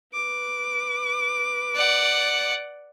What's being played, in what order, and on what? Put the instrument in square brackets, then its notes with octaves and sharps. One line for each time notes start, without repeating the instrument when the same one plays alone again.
[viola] B4 D6
[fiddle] D5 F#5